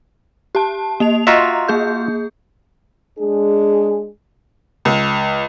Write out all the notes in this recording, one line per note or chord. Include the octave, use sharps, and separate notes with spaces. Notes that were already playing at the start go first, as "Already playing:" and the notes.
G4 A5
A#3 D#5 F7
F4 F#4 D#5 E5 A#5 C6
A#3 G#4 G6
G#3 D4 G#4
C#2